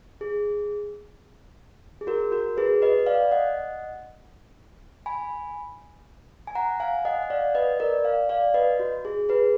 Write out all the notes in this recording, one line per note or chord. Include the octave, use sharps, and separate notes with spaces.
G#4
G#4
F#4 A#4
F#4 A#4
G#4 B4
B4 D#5
D5 F5
D#5 F#5
G#5 B5
G#5
F#5 A#5
F5 G#5
D#5 F#5
F#5
D5 F5
B4 D#5
A#4 D5
D5 F5
D5 F5
B4 D#5
F#4
G#4
G#4 B4